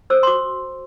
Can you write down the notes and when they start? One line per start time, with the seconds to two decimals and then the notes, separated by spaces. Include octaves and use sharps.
0.10 A4 C5 E6
0.23 C6
0.27 F#4 D6